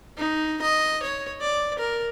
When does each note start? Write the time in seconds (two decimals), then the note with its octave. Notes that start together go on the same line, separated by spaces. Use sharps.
0.18 D#4
0.62 D#5
1.03 C#5
1.41 D5
1.79 A#4